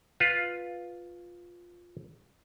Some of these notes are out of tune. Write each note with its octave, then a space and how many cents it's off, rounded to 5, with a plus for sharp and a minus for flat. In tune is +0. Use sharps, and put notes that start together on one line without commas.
F4 +5 B4 +0 F5 +0